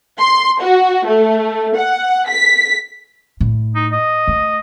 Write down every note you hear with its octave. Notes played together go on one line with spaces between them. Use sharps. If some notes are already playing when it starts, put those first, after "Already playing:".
C6
F#4
A3
F#5
B6
A2
D#4
D#5
A3